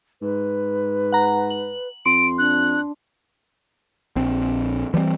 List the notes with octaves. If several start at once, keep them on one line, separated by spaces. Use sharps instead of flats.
G#2 B4
F#5 A#5
F#7
F2 C6 D7
D4 F#6
A#1 C4
E3 G3 A3 C4